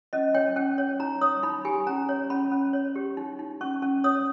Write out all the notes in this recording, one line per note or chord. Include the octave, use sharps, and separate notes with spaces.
C#4 D#5
C#5 G5
C#4 G5
C#5
D#4 A#5
C#5 D#6
D#4 B5
G4 G#5
C#4 A#5
C#5
C#4 B5
C#4
C#5
G4
D#4
D#4
C#4 C#6
C#4
C#5 D#6